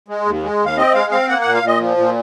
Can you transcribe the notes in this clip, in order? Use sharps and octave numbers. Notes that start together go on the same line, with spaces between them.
G#3
D#2
G#3
D#2
F5
C4 D#5
G#3 F5
C4 F5
A#3 F#5
A#2 F#5
F5
A#2
D#5
F3
A#2